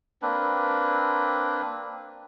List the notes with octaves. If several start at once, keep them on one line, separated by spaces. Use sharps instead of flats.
A#3 C4 D4 B4